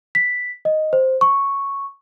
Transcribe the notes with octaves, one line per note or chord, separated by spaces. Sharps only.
B6
D#5
C5
C#6